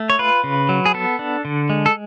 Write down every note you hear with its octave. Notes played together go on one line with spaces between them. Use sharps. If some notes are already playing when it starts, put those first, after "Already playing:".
Already playing: A3
C#5
F4 B4
C#3
F#3
G#4
B3 A4
D4
D3
G#3
A4